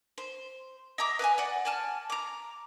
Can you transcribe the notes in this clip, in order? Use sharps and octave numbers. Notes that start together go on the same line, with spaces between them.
C5
D#5 E5 A#5 D6
B4 D#5 F5 G#5
D5 F#5
D5 G#5 A5 F6
A#5 D6